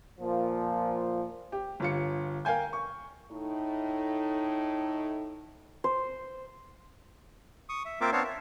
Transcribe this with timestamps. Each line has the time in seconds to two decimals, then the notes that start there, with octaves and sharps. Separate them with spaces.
0.20 A#2 F3
1.52 G4
1.80 G1 F4 C#7
2.45 A#4 F5 G5 G#5 G6
2.73 C#6
3.31 A2 D#4
5.84 C5
7.69 C#6 D#6
7.85 E5
8.01 A#3 C4 F4 A#4 E5 D6
8.12 B3 C4 D4 C#5 F5 A5
8.24 E5